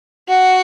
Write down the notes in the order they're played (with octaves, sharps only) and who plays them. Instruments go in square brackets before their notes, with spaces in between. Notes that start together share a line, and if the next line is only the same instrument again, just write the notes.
[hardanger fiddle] F#4 [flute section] F#5